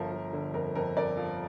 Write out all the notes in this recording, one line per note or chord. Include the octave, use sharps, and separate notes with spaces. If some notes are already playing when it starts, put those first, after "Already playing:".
Already playing: G1 F3 A#4
F3
D3
F2 A#4
F2 A#4
F2 A#4 D5
F3